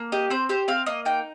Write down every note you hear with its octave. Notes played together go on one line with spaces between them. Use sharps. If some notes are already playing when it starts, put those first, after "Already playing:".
Already playing: A#3
G4 D#5
C4 C5
G4 C5
C4 F5
A#3 D#5
D#4 G5